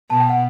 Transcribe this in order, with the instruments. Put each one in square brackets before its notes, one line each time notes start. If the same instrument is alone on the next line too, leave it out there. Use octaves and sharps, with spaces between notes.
[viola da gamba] B2 [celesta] A5
[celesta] G5
F#5